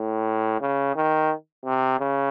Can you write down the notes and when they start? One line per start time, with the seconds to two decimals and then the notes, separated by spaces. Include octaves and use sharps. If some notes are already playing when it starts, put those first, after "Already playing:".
Already playing: A2
0.61 C#3
0.96 D#3
1.65 C3
2.00 C#3